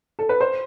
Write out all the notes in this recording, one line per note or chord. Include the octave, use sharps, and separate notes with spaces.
A4
B4
C5